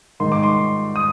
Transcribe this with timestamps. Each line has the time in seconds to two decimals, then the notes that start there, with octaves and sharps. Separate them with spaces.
0.20 G#2 D#3 C6
0.32 D6
0.43 C6
0.96 D#6